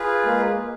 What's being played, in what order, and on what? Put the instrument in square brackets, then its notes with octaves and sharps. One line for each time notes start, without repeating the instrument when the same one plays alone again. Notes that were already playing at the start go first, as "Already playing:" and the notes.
Already playing: [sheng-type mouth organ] F4 G#4 B4
[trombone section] G#3 A#3